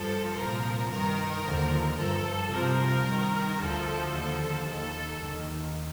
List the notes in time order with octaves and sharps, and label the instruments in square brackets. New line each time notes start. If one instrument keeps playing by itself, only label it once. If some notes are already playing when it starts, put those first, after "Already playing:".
Already playing: [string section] G2 F3 A4
C2 A#2 F3 A#4
G2 D#3 A#4
D#2 D3 F3
G2 F3 A4
C2 C3 F3 A#4
G2 D#3
D2 D3 F3 A4
D#2 D3 F3
D#2 D#3 A4
D#2 D#3